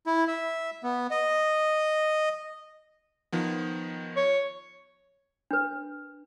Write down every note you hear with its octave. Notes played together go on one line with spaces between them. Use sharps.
E4
E5
B3
D#5
D#3 F3 B3
C#5
D4 B4